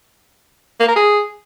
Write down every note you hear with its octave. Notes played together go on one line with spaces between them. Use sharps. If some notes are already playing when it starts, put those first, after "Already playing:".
A#3
A#4
G#4